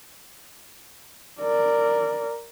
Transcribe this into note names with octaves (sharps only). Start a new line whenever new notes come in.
A#4 D5